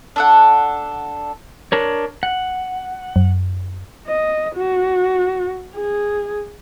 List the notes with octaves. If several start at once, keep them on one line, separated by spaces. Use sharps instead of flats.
D4 A4 F#5
D4 A#4 C#5
F#5
F#2
D#5
F#4
G#4